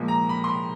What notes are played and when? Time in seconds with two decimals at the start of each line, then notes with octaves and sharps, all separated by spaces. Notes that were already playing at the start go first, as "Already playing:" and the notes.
Already playing: A#2 F3 G#3
0.08 A#5
0.29 B5
0.44 C6
0.48 B5